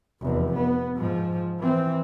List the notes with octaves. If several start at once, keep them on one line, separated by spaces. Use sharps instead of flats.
F1 E2
B3
G#2 F3
E3 C4